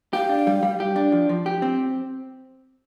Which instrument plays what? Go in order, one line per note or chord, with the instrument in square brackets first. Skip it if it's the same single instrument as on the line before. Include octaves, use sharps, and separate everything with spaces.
[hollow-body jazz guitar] G4 [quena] F5
[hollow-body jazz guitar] D4
G3
G3
G4
D4
F3
F3
G4
C4